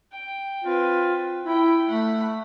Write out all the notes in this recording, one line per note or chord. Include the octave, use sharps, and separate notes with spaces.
G5
C4 F4 B4
E4 G5 B5
A3 F#5 B5